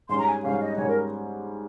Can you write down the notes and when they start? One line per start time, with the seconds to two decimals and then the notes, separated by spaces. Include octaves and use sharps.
0.09 G#2 G3 C#4 G#4 C6
0.18 A#5
0.27 G#5
0.43 G#2 G3 C#4 G#4 F5
0.60 D#5
0.77 G#2 G3 C#4 G#4 C#5
0.87 A#4